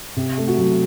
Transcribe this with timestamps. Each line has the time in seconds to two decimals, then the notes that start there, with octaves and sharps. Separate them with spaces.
0.17 C3
0.37 A3
0.48 F#4
0.58 F#3